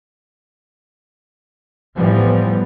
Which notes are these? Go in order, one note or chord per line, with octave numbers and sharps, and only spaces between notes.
A2 E3 F3 G3 B3